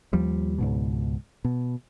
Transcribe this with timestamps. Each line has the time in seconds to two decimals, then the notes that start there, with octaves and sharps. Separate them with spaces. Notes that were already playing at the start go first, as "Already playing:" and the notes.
0.13 D#2 F3 G3
0.58 C#2 G#2 B2
1.45 B2